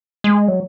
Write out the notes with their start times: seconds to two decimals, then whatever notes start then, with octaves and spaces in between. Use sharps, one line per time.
0.24 G#3
0.48 F#3